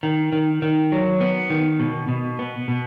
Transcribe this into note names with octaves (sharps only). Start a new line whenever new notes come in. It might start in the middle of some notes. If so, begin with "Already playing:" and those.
D#3
D#3
D#3
F#3
B3
D#3
B2
B2
B3
B2